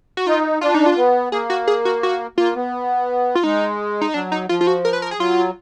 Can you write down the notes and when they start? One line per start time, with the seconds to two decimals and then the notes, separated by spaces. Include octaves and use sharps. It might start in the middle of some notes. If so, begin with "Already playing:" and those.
0.17 F#4
0.27 D#4 F4
0.61 D4 F4
0.74 D#4
0.86 F4
0.97 B3
1.32 A#3 G#4
1.50 F#4
1.67 G#4
1.85 F#4
2.03 F#4
2.38 A#3 F4
2.56 B3
3.35 F4
3.44 G#3 D#4
4.01 D#4
4.14 F#3 D4
4.32 D#4
4.49 F3 F4
4.61 F4
4.67 F#4
4.85 A#4
4.93 B4
5.02 A#4
5.11 G#4
5.19 F#3 F4